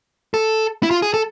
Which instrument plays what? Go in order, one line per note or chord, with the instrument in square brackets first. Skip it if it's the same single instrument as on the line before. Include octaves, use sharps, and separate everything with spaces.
[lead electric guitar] A4
E4
F4
G#4
A4